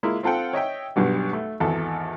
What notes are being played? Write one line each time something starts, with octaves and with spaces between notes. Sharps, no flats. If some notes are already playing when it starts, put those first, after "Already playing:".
G#3 A#3 E4 F4
C4 F4 A4 F#5 G5
C#5 D#5 E5 G5
B1 G2 B2 G3
A3
G#1 E2 A4